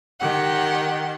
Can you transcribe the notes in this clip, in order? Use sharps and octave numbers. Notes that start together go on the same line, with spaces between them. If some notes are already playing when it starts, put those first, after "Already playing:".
D#3 G4 F#5